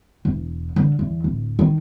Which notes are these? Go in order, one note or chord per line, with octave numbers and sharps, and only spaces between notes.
E1
D3
E2
D1
D#3